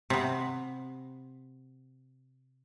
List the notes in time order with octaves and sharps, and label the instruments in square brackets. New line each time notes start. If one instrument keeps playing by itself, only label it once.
[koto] C3 B3